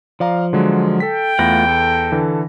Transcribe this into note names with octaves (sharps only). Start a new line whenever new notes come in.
F3 D5 F5 A#5
D3 F#3 G#3
A4 G5 B6
E2 A3 F4 F#5 B5 A#6
A4
D3 E3